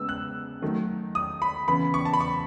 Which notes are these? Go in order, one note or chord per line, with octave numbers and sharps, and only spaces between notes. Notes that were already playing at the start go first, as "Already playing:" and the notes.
Already playing: C#3 G#3 B3 E6
F#6
D#3 F#3 A3
D#6
B5
C#3 E3 B3 B5
C#6
A5
B5
C#6